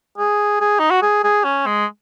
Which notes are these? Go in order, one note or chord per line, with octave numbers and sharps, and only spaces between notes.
G#4
G#4
D#4
F#4
G#4
G#4
C#4
G#3